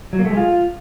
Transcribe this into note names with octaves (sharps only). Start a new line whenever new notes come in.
F#3
A#3
A3
G#3
F4